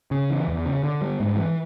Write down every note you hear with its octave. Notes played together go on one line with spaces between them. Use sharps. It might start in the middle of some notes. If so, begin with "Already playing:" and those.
C#3
E3
E2
C#3
D3
G3
G#2
E3